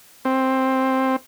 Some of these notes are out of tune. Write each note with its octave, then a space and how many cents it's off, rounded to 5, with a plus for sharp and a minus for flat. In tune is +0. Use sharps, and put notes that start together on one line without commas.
C4 +10